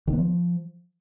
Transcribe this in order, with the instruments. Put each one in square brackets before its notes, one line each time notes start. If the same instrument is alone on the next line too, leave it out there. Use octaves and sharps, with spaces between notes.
[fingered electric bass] D#3
B3
F3